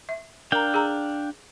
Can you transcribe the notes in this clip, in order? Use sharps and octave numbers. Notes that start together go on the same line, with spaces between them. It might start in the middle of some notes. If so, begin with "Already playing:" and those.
E5
D4 A#4 F5 G5 A#5
G#4 A#5